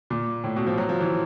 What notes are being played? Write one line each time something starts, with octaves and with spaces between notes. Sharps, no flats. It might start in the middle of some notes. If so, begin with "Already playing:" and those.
A#2
A2
B2
F3
F#3
F3
E3